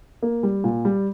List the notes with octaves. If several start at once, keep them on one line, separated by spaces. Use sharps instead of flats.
A#3
G3
A#2
G3